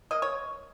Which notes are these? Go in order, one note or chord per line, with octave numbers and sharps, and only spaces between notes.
A#3 D#5
C#5